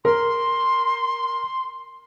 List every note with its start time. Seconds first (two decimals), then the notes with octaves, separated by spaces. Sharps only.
0.05 A#4 C6